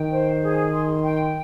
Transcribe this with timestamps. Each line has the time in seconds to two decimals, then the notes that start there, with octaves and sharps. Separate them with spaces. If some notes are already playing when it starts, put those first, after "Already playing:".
Already playing: D#3 G5
0.10 C5
0.41 G#4
0.73 C6
1.04 G5